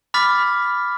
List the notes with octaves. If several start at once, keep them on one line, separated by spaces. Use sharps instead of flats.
B5 D6 F6 A6 B6